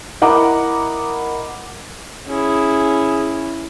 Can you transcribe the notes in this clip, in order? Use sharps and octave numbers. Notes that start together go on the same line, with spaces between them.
E4 A#4 D#5 F#5 A#5 D6
C#4 E4 G#4